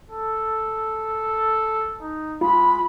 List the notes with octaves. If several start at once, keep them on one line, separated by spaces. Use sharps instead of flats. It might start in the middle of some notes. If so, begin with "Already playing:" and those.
A4
D#4
G#3 F4 B5